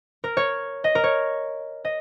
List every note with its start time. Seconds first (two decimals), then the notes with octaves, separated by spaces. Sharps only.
0.24 A#4
0.37 C#5
0.84 D#5
0.95 A#4
1.04 C#5
1.85 D#5